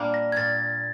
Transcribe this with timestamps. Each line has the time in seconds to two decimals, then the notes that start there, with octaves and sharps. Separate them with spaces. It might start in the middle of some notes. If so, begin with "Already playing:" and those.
Already playing: A#2 G3 A#3 D4
0.14 A#6
0.32 G#6
0.36 A#2 A6